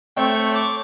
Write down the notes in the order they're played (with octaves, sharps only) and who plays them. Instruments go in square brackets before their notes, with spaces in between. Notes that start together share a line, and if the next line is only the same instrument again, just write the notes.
[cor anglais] A3 [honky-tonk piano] C4 C#5 [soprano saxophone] G5 [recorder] C#6
[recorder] D6